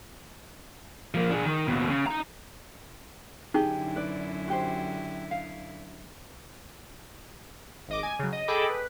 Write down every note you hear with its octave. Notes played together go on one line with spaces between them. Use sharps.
F3 A#3
D4 G#4
D#3
D#2 B2
C#3
D#4 A#5
F#2 D3 D#4 E4 G4 G#4
B4 D5
F#4 G4 C5
F5
G#1 D#5 D6
G#5
C#3 F#3
D#5
G#4 A4 D#5 G5 B5 D6
B4